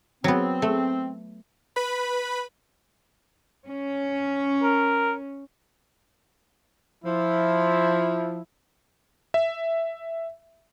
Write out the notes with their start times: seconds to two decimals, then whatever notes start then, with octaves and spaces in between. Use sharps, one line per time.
0.24 F#3 B3 C4
0.62 A3
1.76 B4 B5
3.67 C#4
4.63 A#4
7.04 F3 E4
9.34 E5